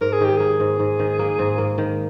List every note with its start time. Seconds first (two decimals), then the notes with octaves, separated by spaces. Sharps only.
0.01 G#2 A#4
0.13 G#4
0.21 D#3 G4
0.37 A#3 G#4
0.60 G#2
0.79 G#2
0.99 D#3
1.19 A#3
1.39 G#2
1.58 A#3
1.78 D#3